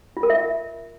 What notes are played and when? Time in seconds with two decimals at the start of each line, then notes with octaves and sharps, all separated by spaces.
0.17 F4
0.23 A#4
0.30 E5